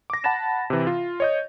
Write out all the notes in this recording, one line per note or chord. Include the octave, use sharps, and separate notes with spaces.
D6 A#6
F#5 A5 B5 A6 A#6 E7
C3 E3
F4
C#5 D#5 G6